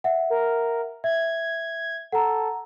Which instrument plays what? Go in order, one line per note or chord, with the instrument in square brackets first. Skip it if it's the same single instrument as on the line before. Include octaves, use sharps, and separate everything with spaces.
[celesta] E5 F#5
[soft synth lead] A#4
[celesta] E5 [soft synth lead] G#6
[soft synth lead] A4 [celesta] F#5 A#5